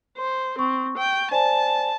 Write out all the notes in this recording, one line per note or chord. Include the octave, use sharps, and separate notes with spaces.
C5
C4 C#6
G5
C5 D5 G#5 A5